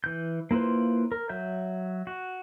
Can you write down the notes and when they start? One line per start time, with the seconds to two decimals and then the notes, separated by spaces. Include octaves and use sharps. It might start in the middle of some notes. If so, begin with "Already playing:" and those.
0.04 E3 G6
0.51 A#3 E4 F4 B4 C5
1.12 A#4
1.29 F#3 E5 G6
2.07 F#4